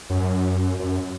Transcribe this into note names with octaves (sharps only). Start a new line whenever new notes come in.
F#2
F#2